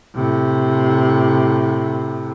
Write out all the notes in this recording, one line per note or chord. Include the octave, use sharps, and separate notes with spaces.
A2 C3